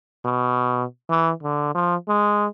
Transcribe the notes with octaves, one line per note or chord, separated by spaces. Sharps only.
B2
E3
D3
F3
G#3